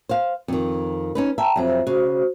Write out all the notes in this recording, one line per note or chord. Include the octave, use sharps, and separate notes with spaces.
C5 F5
F2 D#3
C#4 D#4 B4
E5 G5 A5 A#5
F2 F#3 C5 E5
C#3 F#4 C5